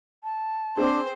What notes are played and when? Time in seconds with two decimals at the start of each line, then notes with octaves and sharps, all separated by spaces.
0.24 A5
0.77 C4 D4 G#4 C5 C6